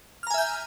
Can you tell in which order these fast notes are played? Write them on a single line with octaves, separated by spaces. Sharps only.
F6 A#5 G#5 E5 G6